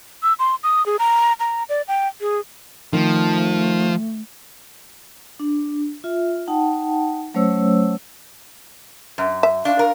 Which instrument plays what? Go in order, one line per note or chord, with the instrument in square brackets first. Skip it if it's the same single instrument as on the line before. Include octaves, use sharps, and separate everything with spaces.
[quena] E6
C6
D#6
G#4
A#5
A#5
D5
G5
G#4
[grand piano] D#3 [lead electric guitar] F3 [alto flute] A3
[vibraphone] D4
F4 E5
D#4 F#5 G5 A5
F#3 A3 C#4 C5 C#5 E6
[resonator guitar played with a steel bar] F#2
[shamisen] E5
[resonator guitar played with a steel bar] D4 [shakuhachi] F5
[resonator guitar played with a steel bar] A#4